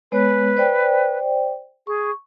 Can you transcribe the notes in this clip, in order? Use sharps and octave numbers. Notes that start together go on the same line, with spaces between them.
G#3 B3 B4 C#5
C5 D5 G5
G#4 C#6